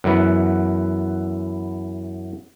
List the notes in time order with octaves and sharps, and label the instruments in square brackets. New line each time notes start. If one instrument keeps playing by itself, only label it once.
[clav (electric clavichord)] F#2 E3 B3